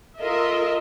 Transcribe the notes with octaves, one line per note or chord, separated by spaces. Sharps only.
F4 A4 A#4 D#5 E5